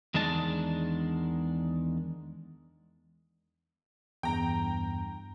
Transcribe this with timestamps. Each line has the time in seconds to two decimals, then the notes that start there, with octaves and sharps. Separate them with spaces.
0.14 E2 D#3 G#3 D4 A5
4.23 E2 G2 G5 A#5